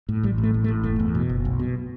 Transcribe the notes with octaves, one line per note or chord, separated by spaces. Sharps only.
A2
A1 G3
A2
A3
A1
A3
A2
F#1 A3
E2
B2
F#1
B1
B2